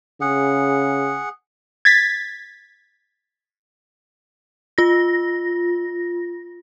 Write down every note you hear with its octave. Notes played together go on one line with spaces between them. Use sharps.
C#3 G#4 F#5
G#6 A6 B6
F4 A#6